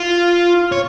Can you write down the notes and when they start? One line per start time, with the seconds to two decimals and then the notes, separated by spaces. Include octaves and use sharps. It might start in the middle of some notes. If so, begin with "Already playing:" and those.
Already playing: F4
0.72 C#5